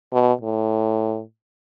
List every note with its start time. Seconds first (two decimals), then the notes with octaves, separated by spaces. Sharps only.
0.13 B2
0.41 A2